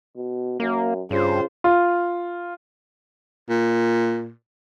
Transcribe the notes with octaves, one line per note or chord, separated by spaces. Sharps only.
B2
F#2 A#3
G2 C#3 F4 C5
F4
A#2